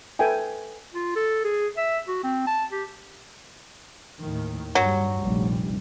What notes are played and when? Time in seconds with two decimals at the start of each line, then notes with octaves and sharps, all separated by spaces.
0.19 A4 B4 E5 G5 G#5
0.94 F4
1.16 A4
1.45 G#4
1.77 E5
2.08 F#4
2.24 C4
2.47 A5
2.72 G4
4.19 D#2 A2 D#3
4.75 G2 F#3 G3
5.19 F1 A#1 G3